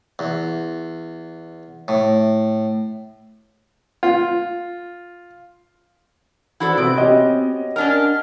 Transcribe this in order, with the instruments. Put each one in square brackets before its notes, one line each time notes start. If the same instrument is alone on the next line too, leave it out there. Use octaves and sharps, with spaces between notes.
[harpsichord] E2
A2
[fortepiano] F4
[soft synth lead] E3 [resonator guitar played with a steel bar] E4 F#4 A4 [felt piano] C5 D5 F#5
[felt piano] C3 C4 B4 [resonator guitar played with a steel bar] B3 [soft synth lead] D7
[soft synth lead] C4 [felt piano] C#4 F#4 C#5 [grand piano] G4 D#5
[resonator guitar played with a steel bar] C#4 D4 A#4 [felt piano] F#5 [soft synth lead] F6